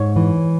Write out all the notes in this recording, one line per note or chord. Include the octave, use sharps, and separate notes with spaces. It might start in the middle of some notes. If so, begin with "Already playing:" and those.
Already playing: G#2 C#5
E3